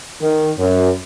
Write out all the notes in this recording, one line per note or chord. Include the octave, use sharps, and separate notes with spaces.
D#3
F#2